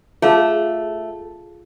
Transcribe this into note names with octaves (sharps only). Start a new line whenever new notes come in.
A3 F4 G#4 F5